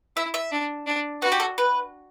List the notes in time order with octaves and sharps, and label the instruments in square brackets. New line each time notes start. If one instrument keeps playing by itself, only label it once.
[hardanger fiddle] E4 [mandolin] E5
[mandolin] E5
[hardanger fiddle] D4
D4
[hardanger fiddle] F#4 [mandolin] B4
[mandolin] G4
A4
B4